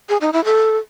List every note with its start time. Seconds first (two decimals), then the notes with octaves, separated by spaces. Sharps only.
0.09 G#4
0.21 D#4
0.33 E4
0.45 A4